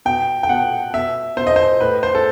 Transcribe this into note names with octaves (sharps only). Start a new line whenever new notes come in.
B2 G5
G5
B2 F#5
B2 E5
B2 C5
D#5
C5
A2 B4
C5
A4